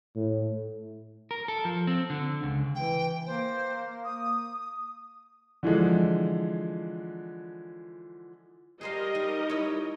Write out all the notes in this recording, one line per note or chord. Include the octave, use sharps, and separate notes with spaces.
A2
A#4
A4
F3
C4
D3
C#2
E3 G5
A#3 C5
D#6
D3 E3 F3 G#3
G3 G#4 A#4 C5 D#5 F5
D#4
E4 C#5